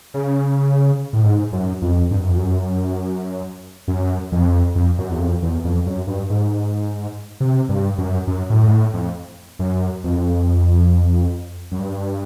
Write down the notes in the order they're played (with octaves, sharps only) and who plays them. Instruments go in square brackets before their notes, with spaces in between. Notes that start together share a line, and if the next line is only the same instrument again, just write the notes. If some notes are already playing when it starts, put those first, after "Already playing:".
[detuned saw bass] C#3
A2
G#2
F#2
F2
G2
F#2
F2
F#2
F#2
F2
F2
F#2
E2
F2
E2
F2
F#2
G2
G#2
C3
G2
F#2
F#2
A2
G#2
A2
F2
F#2
F2
F#2
G2